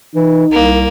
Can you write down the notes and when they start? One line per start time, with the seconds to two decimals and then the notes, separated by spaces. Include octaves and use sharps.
0.16 E3 D#4
0.52 C2 A#3